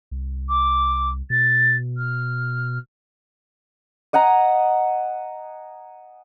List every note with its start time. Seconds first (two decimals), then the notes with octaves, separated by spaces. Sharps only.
0.11 C2
0.48 D6
1.30 B2 A6
1.97 F6
4.13 D#5 F#5 G#5 A#5